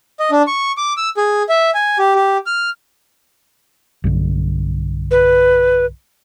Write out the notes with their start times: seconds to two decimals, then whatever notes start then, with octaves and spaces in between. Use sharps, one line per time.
0.20 D#5
0.31 D4
0.47 C#6
0.77 D6
0.97 E6
1.17 G#4
1.49 E5
1.74 G#5
1.99 G4
2.15 G4
2.46 F6
4.04 B1 G2 D3
5.11 B4